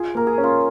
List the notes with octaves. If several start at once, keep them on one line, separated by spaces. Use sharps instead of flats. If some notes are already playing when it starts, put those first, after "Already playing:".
Already playing: F4 G#4
A#3 A#4
G#4
C#4
F4